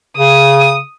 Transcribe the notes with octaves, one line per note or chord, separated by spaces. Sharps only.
C#3 D#6